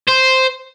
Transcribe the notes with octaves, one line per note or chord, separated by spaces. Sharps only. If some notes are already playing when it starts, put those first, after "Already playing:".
C5